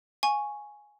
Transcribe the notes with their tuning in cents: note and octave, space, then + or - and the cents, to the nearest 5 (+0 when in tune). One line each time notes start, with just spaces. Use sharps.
F5 +30 G#5 +0 C#6 +0